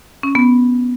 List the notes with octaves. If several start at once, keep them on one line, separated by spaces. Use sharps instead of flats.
C#4
B3